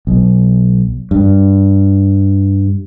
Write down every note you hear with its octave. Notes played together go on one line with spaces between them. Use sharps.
B1
G2